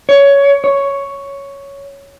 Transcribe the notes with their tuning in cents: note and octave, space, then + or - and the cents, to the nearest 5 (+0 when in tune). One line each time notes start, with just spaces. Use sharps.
C#5 +15
C#5 +5